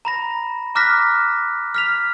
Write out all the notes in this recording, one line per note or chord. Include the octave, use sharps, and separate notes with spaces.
A#5 B5 A#6
A#5 D6 F6 F#6 A#6 B6
F6 B6 F7